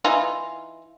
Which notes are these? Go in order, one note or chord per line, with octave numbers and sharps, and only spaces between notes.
E3 D#4 F4